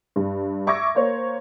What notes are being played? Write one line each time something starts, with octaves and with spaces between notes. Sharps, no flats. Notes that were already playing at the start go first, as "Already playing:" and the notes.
G2
E5 C#6 D6 E6 G#6 A#6
A#3 C5 C#5